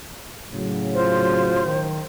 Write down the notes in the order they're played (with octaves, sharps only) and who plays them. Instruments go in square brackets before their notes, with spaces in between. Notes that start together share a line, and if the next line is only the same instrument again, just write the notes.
[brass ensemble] A2 C#3 F#3
[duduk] F4 [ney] C5
[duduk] D#3